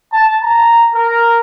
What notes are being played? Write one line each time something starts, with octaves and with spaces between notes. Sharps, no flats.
A5
A#5
A#4